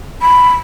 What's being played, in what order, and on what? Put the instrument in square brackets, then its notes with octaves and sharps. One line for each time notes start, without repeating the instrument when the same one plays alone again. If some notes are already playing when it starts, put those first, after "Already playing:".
[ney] B5